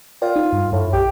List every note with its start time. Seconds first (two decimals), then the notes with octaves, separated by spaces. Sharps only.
0.22 F4 A#4 D5 G5
0.36 D#4
0.53 G2
0.72 F#2 A2
0.93 A#1 G4